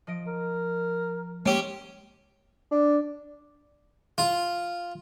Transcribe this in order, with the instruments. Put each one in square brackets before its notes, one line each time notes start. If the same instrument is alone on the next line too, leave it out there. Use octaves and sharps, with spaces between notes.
[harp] F3 D#5 D7
[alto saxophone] A#4
[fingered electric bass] G#3 A#3 [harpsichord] C#4 G4 [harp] C6 E6 D7
[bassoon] D4
[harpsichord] F4